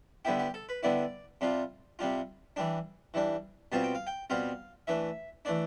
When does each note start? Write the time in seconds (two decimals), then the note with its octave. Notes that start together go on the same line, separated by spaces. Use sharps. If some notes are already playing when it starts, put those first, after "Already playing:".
0.25 D3 G3 B3 E4 G4
0.39 G4
0.54 A4
0.69 B4
0.83 D3 G3 B3 E4 D5
1.41 C3 G3 D4 F4
1.99 C3 G3 D4 F4
2.56 E3 G3 D4
3.14 E3 G3 D4
3.72 B2 G3 C4 F4 A5
3.83 G5
3.95 F5
4.07 G5
4.30 B2 G3 C4 F4 F5
4.87 E3 A3 D4 E5
5.45 E3 A3 D4 D5